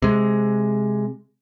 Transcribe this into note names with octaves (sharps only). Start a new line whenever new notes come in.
C3 G#3